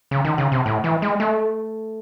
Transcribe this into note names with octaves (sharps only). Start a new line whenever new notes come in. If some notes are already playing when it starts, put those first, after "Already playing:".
C#3
D#3
C#3
C3
A2
E3
G#3
A3